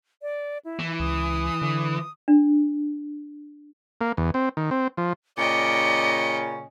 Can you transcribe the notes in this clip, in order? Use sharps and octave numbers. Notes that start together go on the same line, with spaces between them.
D5
E4
E3
C#2 D#6
D3
D4
A#3
E2
C4
D#3
C4
F3
A#2 C#3 C#4 D5 D#5 G5 C#7